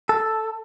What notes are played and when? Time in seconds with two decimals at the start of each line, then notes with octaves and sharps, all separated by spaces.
0.09 A4